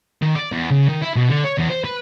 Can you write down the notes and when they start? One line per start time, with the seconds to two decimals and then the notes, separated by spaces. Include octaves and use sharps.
0.22 D#3
0.35 D5
0.52 E2
0.71 C#3
0.89 D#3
1.02 E4
1.16 B2
1.29 D3
1.44 C#5
1.58 E2
1.70 C5
1.84 B4